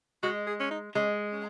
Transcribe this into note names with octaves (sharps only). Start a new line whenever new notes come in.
G#3 F#4
G#4
C#4
D#4
G#3 C#4
C#4